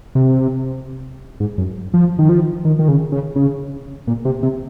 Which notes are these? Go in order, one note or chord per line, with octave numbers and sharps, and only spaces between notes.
C3
G#2
F#2
F3
D#3
F3
D#3
D#3
C#3
C#3
C#3
A#2
C3
C3